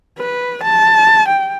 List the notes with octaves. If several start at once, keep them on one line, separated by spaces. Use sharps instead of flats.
B4
A5
G5